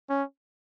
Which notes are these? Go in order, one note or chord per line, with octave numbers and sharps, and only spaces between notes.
C#4